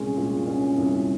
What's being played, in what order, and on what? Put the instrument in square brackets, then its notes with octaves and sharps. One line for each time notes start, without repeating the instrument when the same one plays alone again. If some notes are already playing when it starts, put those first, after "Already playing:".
Already playing: [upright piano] C2 A#2 G#3 C#4
A#2
C#4
C2